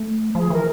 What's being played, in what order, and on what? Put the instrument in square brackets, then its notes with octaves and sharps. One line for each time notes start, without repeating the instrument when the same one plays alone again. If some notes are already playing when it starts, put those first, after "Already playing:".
Already playing: [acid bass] A3
[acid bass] F3 [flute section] G#4
[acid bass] E3 [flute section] A#4